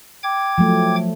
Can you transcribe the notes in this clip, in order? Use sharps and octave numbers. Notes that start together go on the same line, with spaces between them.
G5 D6 G#6
F3 F#3 A3